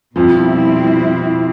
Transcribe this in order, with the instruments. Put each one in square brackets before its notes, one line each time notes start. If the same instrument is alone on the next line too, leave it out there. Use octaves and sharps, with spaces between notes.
[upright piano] F2 F3 [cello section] B2 G3 C4 E4